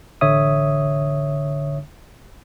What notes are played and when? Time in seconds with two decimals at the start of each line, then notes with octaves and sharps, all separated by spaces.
0.21 A1 D3 C#5 E5 D#6